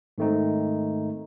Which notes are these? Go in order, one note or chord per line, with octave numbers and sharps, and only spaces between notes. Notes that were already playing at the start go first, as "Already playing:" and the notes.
G#2 D#3 A3 C4 D#4